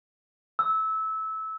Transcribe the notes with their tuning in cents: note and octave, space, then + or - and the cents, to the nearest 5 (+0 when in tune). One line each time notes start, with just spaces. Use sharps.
E6 -20